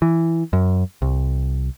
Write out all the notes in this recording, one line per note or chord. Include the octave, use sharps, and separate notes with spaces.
E3
F#2
C2